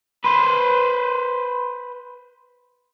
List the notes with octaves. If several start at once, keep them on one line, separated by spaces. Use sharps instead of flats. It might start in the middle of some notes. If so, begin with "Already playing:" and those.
B4 C5